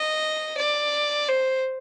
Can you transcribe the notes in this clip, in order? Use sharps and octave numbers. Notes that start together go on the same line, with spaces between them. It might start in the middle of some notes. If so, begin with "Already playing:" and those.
Already playing: D#5
D5
C5